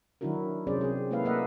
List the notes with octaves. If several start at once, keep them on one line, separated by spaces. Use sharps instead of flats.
D#3 F#3 D4 E4 F#4 A#4
C3 F#3 C#4 G#4 C5 D5
C4 G#4
A3 A#3 E4 A4 B4 F5
A#3 B4 D#5 E5 F#5